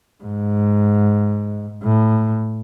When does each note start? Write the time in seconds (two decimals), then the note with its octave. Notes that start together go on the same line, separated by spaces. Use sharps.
0.23 G#2
1.83 A2